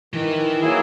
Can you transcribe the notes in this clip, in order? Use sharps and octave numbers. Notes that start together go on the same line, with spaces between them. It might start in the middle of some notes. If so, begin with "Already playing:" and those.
D#3 E3
F#3 A#3 E4 G#4